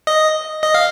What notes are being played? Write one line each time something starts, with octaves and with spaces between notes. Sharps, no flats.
D#5
D#5
F5